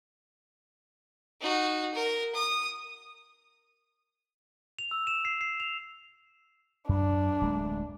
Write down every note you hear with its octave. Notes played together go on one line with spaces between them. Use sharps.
D#4 F#4
A#4
D#6
F7
E6
E7
C7
C7
F7
F#2 D4
D1 G#3 A3